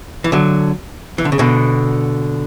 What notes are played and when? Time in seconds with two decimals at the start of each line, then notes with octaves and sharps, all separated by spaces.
0.24 E3
0.32 D3 F#3
1.18 E3
1.25 D3
1.32 C#3
1.39 B2 D3